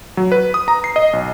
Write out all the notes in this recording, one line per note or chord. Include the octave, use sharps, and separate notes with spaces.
F#3
B4
D#6
A#5
C7
D#5
B1